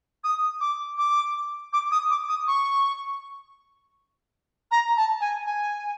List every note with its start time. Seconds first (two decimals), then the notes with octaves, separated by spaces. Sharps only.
0.24 D#6
0.61 D6
0.98 D6
1.73 D6
1.91 D#6
2.10 D6
2.29 D#6
2.48 C#6
4.71 A#5
4.97 A5
5.21 G#5
5.46 G#5